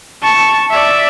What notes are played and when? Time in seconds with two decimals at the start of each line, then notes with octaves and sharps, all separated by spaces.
0.23 A5 C#6
0.71 D5 E5